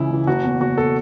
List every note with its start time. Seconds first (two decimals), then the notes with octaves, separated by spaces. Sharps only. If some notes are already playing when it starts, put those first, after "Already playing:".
Already playing: C#2 C#3 E3 E4
0.11 C#3 E3
0.27 F#1 F#4
0.44 E2 B2
0.60 F#1 F#4
0.78 B2 A4